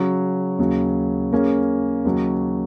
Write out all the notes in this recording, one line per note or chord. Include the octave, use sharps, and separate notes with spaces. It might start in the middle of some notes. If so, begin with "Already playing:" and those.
Already playing: C#3 F#3 C#4
D#2 C#3 F#3
C#3 A#3 C#4 G#4
D#2 C#3 F#3